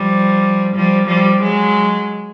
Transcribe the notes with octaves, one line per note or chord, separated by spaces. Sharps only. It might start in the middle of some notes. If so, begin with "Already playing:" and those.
Already playing: F3 G3
F3 G3
F3 G3
F#3 G#3